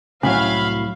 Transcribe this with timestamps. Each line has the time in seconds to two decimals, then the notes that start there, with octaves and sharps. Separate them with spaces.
0.23 C2 A2 F#3 C#4 E5 F5 B5